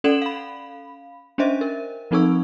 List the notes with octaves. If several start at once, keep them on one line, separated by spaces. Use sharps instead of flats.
C#4 A4 D5 F#5 E7 F#7
F5 B5
C#4 D4 C5 D#5 E5
A#4
F3 C4 D#4 A4 C#6 E6